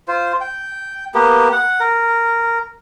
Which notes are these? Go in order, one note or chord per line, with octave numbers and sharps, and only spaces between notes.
F4 C5
G5
A#3 B3 G4
F#5
A#4